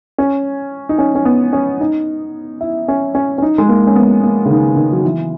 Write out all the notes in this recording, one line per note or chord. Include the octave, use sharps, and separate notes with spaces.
C#4
D#4
C#4
C#4
B3
C#4
D#4
E4
C#4
C#4
C#4
D#4
G#3
A#3
C#4
B3
A#3
C#3
D#3
D#3
F#3
E3